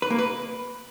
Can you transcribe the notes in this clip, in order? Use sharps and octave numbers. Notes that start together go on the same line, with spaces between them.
B4
A#3
B4